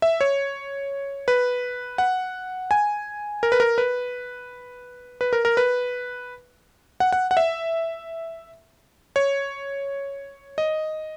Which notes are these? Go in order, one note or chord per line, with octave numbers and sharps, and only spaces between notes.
E5
C#5
B4
F#5
G#5
A#4
B4
A#4
B4
B4
A#4
A#4
B4
F#5
F#5
F#5
E5
C#5
D#5